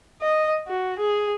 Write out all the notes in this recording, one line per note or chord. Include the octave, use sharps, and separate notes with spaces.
D#5
F#4
G#4